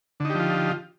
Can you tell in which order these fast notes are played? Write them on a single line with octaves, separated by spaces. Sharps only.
D3 D#4 G4 F3 F4